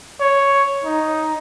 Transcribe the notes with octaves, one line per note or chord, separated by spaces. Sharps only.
C#5
D#4